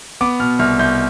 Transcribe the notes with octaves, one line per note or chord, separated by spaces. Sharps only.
B3 D6
B2 F6
C2 F6
C2 G6